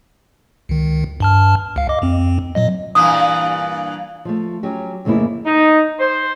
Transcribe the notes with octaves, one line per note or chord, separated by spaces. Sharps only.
C#2 D#3
G2 A5 F6
C#2 F5
D#5 D6
F2 C4
A#2 F#3 D#5
G2 A#2 E3 D#6
F3 A3
F#3 C#4 G4
F2 C#3 A3 A#3 E4
D#4
C5